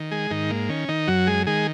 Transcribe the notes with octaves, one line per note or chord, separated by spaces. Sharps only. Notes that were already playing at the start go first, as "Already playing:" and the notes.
Already playing: D#3
G#3 G#4
G#2 D#3 D#4
A#3
D#3 C#4
D#3 D#4
F#2 F#3 F#4
G#3 G#4
D#3 G#3 G#4